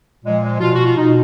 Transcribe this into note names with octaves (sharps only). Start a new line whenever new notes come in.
A#2 F3 G#3
G#3
B2 F4
F#4
F4
B2 D#4